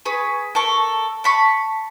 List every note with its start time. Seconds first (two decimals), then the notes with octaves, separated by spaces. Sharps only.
0.06 G#4 B4 C#6
0.55 A4 A#4 C#6
1.24 A5 B5 C#6